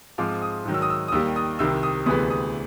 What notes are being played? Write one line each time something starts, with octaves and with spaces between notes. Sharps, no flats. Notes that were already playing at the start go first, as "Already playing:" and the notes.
G#2 F3 G#3 C4 D6
D#6
G#2 D#3 F#3
E6
D#6
E6
D#6
D#2 D#3 G3 E6
D#6
C2 C3 D#3 E6
D#6
D2 C3 E3 G#3 B3 D#6
D#6